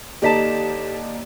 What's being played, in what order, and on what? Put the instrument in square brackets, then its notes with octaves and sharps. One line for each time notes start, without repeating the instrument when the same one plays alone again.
[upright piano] D#2 D#4 A5 [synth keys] G4 D5 [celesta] A4 B6 E7